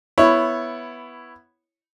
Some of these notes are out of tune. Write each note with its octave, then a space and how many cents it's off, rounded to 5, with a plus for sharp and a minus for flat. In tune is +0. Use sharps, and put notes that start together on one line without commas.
B3 +0 E4 +10 C#5 -5